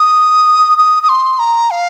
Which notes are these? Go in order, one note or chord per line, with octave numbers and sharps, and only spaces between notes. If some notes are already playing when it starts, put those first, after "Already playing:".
Already playing: D#6
D#6
D#6
C6
A#5
F5